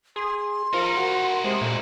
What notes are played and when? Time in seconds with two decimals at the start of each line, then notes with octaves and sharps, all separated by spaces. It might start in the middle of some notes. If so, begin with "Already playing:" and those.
0.16 G#4 C6
0.73 F3 D#4 E4 A#4
0.96 F#4
1.44 C3 G#3
1.61 A#2 A3